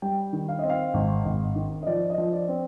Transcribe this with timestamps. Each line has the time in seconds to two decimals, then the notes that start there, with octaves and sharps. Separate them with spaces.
0.02 G3 G5
0.33 D#3
0.49 F5
0.59 C4 D#5
0.69 F5
0.94 G#1
1.25 G#1
1.56 D#3
1.83 D#5
1.87 F3 D5
2.10 D#5
2.18 F3
2.33 D5
2.48 C4